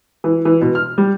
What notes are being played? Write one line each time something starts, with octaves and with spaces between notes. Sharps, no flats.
E3
E3
B2
F6
G3